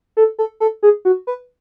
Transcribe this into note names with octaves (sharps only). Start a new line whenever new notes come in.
A4
A4
A4
G#4
F#4
B4